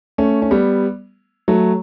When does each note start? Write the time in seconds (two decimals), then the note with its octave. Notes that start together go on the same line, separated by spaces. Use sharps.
0.18 A3 C#4
0.42 C#4
0.51 G3 B3
1.48 F#3 A3